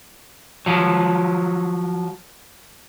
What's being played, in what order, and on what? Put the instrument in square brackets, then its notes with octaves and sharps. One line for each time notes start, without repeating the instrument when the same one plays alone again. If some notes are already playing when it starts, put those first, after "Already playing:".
[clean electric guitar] F3 F#3